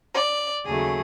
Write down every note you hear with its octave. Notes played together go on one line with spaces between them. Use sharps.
D5
D#2 C#3 F#3 A3 G#4